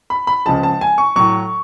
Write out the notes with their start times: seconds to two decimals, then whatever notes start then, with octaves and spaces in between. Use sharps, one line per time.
0.10 B5
0.27 B5
0.46 C#2 C#3 F3 G#3 A5
0.63 A5
0.81 G#5
0.98 C#6
1.16 A2 F#3 C#6